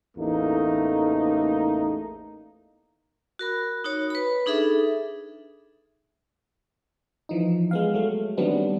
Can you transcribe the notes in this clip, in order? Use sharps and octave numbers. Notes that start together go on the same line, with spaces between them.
A1 E2 A3 A#3 D#4
F#4 A#4 B5
D#4 F#4 C#5
B4 B5
D4 D#4 G#4 A4 E5
E3 F3 D#4
G#3 B3 F5
F#3 A3
D#3 F#3 G3 B3 C4 D4